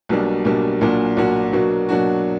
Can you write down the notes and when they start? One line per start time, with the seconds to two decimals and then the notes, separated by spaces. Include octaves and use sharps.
0.09 B1 B2 G3 A#3 D4
0.45 B1 B2 G3 A#3 D4
0.81 B1 A#2 A#3 D4 F#4
1.17 B1 A#2 A#3 D4 F#4
1.53 B2 F#3 A#3 D4 F#4
1.89 B2 F#3 A#3 D4 F#4